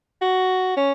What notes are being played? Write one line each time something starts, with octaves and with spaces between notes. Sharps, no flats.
F#4
C#4